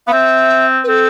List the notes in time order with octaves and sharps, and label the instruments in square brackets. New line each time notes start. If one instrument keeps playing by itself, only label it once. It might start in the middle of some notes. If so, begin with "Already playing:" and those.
[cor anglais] B3 [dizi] F5
[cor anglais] C4 [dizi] E5
[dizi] B4
[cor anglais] C4 [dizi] A4